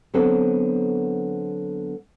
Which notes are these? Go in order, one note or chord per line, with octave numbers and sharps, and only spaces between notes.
D3 F#3 B3 C4 A4 B4